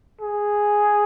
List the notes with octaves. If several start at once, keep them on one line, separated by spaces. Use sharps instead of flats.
G#4